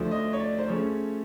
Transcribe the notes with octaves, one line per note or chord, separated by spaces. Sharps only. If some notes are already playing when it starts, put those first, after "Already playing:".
Already playing: D2 D3 F3
D#5
C#5
D5
C5
C#3 F3 A3 C#4 C#5